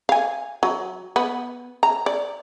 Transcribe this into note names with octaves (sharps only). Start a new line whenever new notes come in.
F5 G#5
F#3
B3
A#5
D5